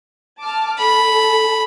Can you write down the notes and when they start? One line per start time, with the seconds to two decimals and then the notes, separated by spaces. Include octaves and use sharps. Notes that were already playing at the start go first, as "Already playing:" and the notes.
0.41 A5 D6 F6
0.79 A4 B5